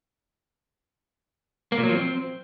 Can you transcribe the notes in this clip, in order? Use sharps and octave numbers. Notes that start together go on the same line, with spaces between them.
A#3
A#2
F#3
F3
C4